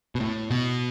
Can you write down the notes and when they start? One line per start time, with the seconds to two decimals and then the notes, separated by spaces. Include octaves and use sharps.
0.15 B2
0.20 A2
0.51 B2